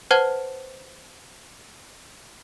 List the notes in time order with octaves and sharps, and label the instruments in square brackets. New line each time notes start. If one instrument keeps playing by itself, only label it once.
[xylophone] B4 C5 F#5 A5 F6 G#6